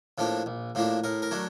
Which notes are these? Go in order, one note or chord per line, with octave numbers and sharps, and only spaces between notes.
A2 F3 A#3 D4
A#1
A2 F3 A#3 D4
A2 A#4
A#4
F#3 A3 D4